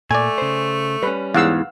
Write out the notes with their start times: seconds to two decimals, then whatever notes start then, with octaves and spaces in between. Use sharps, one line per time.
0.11 A#2 A3 D5 G#5
0.38 C#3 C5
1.03 G3 C#4 B4
1.34 E2 G#2 F5 F#5 E6